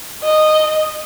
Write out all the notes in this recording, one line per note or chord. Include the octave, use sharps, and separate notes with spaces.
D#5